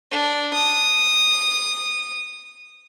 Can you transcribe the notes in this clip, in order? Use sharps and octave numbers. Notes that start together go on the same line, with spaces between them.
D4
D#6